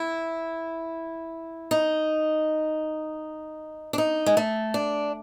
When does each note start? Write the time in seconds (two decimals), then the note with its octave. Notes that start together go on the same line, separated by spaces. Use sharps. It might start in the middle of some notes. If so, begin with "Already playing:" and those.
Already playing: E4
1.71 D#4
3.93 D4
3.98 D#4
4.26 G#3
4.37 A3
4.74 D4